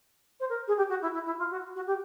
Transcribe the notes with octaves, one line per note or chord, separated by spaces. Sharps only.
C5
A#4
G#4
G4
F#4
E4
E4
E4
F4
F#4
F#4
G4